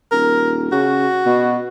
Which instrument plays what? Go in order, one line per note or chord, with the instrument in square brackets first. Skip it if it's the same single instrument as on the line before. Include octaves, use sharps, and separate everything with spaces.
[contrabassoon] D#1 [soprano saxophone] A#4
[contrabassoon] C#3 [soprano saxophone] F#4
[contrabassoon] B2